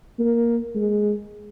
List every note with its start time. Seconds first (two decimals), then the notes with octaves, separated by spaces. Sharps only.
0.19 A#3
0.75 G#3